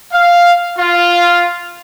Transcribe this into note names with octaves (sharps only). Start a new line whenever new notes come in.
F5
F4 F5